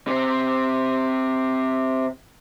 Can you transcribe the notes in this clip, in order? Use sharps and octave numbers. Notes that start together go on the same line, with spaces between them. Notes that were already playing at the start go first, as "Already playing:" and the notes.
C3 C4